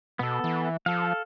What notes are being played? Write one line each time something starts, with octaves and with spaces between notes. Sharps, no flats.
B2 B3 A4
E3
F3 A4 F5